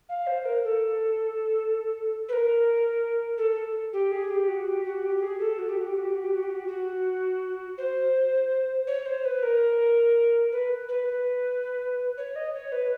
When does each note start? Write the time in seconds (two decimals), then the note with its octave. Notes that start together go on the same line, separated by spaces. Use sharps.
0.09 F5
0.27 C5
0.45 A#4
0.64 A4
2.29 B4
2.33 A#4
3.38 A4
3.93 G4
4.12 G#4
4.30 G4
4.48 F#4
4.67 G4
4.84 F#4
5.03 G4
5.22 G#4
5.40 A4
5.58 F#4
5.67 G4
5.77 F#4
5.86 G4
5.95 F#4
6.05 G4
6.14 F#4
6.24 G4
6.34 F#4
6.43 G4
6.51 F#4
6.67 F#4
7.78 C5
8.87 C#5
9.06 C5
9.25 B4
9.43 A#4
10.52 B4
10.89 B4
11.08 B4
12.17 C#5
12.36 D#5
12.54 C#5
12.72 B4